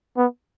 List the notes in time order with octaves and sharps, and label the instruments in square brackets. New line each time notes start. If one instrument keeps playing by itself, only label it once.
[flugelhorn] B3